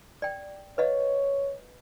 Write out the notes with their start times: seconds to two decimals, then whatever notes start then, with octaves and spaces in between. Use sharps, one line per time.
0.22 D5 G5
0.78 B4 C#5 D#5 F5